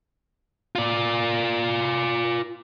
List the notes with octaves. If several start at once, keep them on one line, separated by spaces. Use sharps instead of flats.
F4 D5